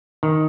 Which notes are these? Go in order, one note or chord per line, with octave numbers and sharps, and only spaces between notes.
D#3